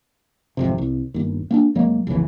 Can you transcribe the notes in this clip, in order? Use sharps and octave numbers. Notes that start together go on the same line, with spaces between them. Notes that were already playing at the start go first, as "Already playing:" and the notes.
G#1 F2 C3
C2
G1 D#2
A#3 B3 D4
F1 F#3 G#3 A#3
F1 A#1 C#3 E3